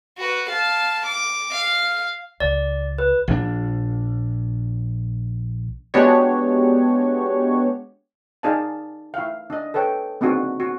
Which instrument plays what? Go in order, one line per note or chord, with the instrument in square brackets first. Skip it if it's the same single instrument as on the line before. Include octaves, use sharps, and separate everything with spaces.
[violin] F#4 B4
F5 A5
D6
F5
[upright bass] C#2 [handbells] D5
[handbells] B4
[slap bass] A#1 D4
[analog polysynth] G#3 B3 D4 F#4 G4 C#5
[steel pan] D#4 G#4 D5 F5 A5
E4 F5
D4 D#5
A4 B4 C#5 G5
G#3 A#3 C4 D4 D#4 F#4
F#4